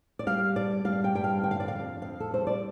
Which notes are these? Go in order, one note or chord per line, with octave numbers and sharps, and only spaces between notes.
D5
G3 F5
G2 D5
G3 F5
G5
G2 G5
F5
D3 G5
F5
D5
F2 F5
F2 F5
A4
G3 C5
D5